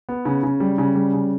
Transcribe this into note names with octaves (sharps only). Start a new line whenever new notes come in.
B3
C#3
C#3
G3
C#3
G3
C#3